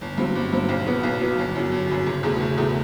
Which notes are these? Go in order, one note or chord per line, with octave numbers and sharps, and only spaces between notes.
G1
G2 F#3 C4
G1
G2 F#3 C4
B1
B2 F#3 B3
B1
B2 F#3 B3
G1
F#2 F#3
G1
F#2 F#3
F#1
E2 B2 A3
F#1
E2 B2 A3